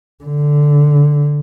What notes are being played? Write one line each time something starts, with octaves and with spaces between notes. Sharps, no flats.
D3